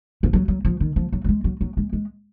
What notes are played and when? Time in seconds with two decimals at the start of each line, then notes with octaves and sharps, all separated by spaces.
0.23 F3
0.33 F#3
0.48 F#3
0.65 F3
0.80 D#3
0.96 F3
1.12 F#3
1.24 F#3
1.29 G#3
1.44 F#3
1.61 F#3
1.77 G#3
1.93 G#3